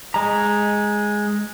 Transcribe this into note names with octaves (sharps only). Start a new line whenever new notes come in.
G#3 A#5